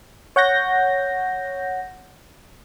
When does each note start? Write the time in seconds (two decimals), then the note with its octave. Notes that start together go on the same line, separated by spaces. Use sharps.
0.36 C#5 F#5 G6 A#6